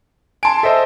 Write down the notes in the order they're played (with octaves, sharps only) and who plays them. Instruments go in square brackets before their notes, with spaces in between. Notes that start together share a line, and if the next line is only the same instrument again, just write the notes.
[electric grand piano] G#5 C6 [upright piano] A5 D7
[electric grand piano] A4 C5 [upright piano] D#5 E5